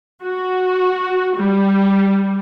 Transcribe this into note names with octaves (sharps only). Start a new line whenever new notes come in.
F#4
G3